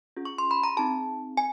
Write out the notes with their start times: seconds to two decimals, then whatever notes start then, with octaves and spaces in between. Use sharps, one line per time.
0.16 C#4 F4 G#4
0.25 C#6
0.38 C6
0.51 B5
0.63 A#5
0.77 C4 D#4 G#4 A5
1.37 G#5